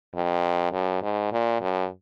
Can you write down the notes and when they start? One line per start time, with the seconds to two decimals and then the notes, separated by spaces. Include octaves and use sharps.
0.15 F2
0.73 F#2
1.03 G#2
1.32 A#2
1.61 F#2